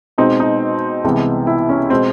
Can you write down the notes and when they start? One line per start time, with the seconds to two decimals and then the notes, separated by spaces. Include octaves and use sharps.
0.18 B2 G#3 C4 D#4
0.40 D#4
1.04 C2 C3 E3 G#3 B3
1.47 E4
1.69 C#4
1.90 B2 G#3 C4